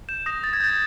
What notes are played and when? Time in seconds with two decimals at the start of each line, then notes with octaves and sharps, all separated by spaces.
0.09 G6 E7
0.26 D#6 A#6
0.43 D#6 A6
0.53 G#6
0.60 G6 A6